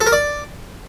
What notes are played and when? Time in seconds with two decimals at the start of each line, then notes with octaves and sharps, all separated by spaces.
0.01 A4
0.06 A#4
0.12 D5